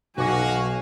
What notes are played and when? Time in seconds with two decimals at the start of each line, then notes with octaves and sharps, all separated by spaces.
0.18 B1 B2 F#4 F5 G#5 D6 A#6